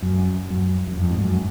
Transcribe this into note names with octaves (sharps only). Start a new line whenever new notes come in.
F#2
F#2
F#2
F2
G#2
F#2